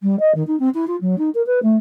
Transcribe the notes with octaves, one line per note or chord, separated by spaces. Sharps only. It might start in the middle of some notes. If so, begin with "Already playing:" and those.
G3
D#5
D#3
D#4
C4
E4
F4
F#3
D#4
A#4
B4
A3